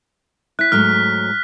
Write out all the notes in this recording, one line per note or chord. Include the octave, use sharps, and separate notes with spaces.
E4 F#6 B6
G#2 F#3 A3 F6